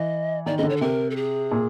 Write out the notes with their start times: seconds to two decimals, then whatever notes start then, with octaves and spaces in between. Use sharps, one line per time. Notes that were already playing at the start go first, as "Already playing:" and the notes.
Already playing: E3 D#5
0.46 D#3 D5
0.58 C#3 D#5
0.63 D3
0.70 C#5
0.77 A4
0.81 C3 A#4
1.10 A4
1.16 G#4
1.51 A#2